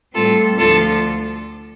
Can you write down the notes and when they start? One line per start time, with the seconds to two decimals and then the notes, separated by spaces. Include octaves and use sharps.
0.14 A2 G3 C4 F4 A4
0.58 D2 D3 F3 F4 A4